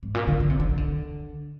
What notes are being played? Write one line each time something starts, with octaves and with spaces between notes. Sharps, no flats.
G#2
A#2
D3
D3
C3
D3
D#3
D3